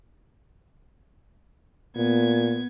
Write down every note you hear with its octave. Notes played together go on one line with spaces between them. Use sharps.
A#2 B3 G#6